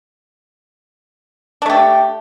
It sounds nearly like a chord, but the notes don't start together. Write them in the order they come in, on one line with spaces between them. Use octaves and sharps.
D4 A3 G4